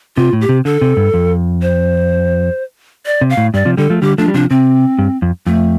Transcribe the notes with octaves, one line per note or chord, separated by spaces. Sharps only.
C3 F4
A2
G4
C3
D3 A4
C3
G2
F2
C5
D5
C3
F5
A2
G2 D5
C3 F3
D3 G3 A4
F3 A3
D3 G3 G4
F3 A3 D4
G3
C3 F3 D4
C3 C4
G2
F2
F2 A3